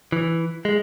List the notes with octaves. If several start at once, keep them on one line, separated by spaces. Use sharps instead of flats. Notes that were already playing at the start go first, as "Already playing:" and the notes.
E3
G#3